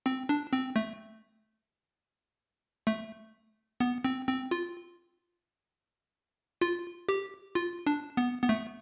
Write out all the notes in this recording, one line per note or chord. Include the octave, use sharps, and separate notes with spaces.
C4
D4
C4
A3
A3
B3
C4
C4
F4
F4
G4
F4
D4
B3
B3
A3